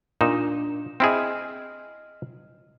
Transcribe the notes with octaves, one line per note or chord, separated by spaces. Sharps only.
A#2 D4 D#4 E7
C4 E4 G#4 D#5 F6